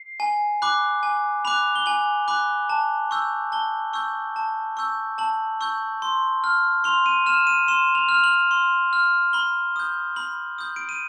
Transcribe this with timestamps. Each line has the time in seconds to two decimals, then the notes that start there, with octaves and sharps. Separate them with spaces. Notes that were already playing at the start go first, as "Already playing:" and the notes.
Already playing: C7
0.20 G#5
0.62 B5 D6 F#6
1.03 G#5
1.45 B5 D6 F#6 F7
1.76 G7
1.86 G#5 F#7
2.28 B5 D6 F#6
2.70 A5
3.11 C#6 E6 G6
3.52 A5 G7
3.93 C#6 E6 G6
4.36 A5
4.77 C#6 E6 G6
5.18 A5 F#7
5.61 C#6 E6 G6
6.02 C6
6.44 F6
6.84 C6 F7
7.06 D#7
7.26 F6 E7
7.47 D#7
7.68 C6 E7
7.95 F7
8.09 F6
8.14 F7
8.24 F#7
8.51 C6
8.93 F6
9.33 B5 G7
9.76 D#6 G6
10.16 B5 F#7
10.58 D#6 G6
10.76 D7
10.89 D#7